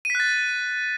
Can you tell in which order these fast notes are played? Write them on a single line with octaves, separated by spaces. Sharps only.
D#7 B6 F#6 A6